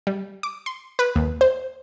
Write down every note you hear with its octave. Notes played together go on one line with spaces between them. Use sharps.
G3
D6
C6
B4
D#2
C5